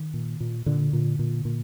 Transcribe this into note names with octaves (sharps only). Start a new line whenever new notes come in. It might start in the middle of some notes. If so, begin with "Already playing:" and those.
Already playing: D#3
A#2
A#2
A#2 D3
A#2
A#2
A#2